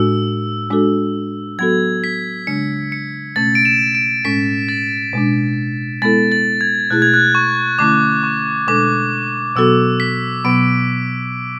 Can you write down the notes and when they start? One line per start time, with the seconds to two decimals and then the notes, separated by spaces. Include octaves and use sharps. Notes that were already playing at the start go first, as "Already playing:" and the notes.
Already playing: A2 G#3 D4 F#4 E6
0.70 G#3 D4 F#4 A4
1.59 F#3 B3 F#4 A4 G#6
2.04 B6
2.47 C#3 G#3 D4 C#7
2.92 C#7
3.36 B2 A3 C#4 A6
3.55 D7
3.65 E7
3.95 D7
4.25 A2 G#3 C#4 B6
4.69 A6
5.13 B2 G#3 D4
6.02 G#3 B3 E4 A4 A6
6.32 A6
6.61 G#6
6.90 B2 A3 E4 G#4 F#6
7.02 G#6
7.14 F#6
7.35 C#6
7.79 D3 A3 C#4 E4 D6
8.23 C#6
8.67 B2 G#3 D4 A4 D6
9.56 B2 F#3 B3 F#4 A4 E6
10.00 B6
10.44 B2 F#3 B3 D7